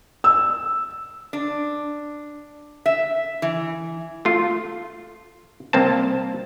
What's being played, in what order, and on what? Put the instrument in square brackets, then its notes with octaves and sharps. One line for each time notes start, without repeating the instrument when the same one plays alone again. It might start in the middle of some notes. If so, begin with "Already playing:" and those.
[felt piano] E6
[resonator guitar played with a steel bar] D4
E5
E3
[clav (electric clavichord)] A3 F4
C2 A#3 C4 A5